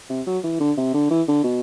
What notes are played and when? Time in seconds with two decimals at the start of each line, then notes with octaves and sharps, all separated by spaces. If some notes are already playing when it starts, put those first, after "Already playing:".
0.10 C3
0.27 F#3
0.44 E3
0.60 D3
0.77 C3
0.94 D3
1.11 E3
1.28 D3
1.44 B2